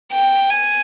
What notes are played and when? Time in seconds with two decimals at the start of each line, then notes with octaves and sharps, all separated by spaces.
0.13 G5
0.49 G#5